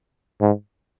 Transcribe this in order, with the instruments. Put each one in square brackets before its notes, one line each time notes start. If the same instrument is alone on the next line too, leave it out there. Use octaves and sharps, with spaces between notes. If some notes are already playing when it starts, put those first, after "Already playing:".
[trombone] G#2